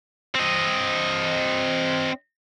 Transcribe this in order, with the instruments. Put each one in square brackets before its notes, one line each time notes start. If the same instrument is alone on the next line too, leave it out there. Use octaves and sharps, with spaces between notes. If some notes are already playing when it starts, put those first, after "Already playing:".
[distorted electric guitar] C4 D#5